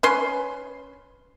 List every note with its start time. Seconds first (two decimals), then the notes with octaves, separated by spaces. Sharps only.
0.03 C#4 B4 C6